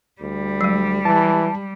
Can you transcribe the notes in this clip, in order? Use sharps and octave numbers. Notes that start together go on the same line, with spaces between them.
D2 G3
F#3 G#3
E3 A5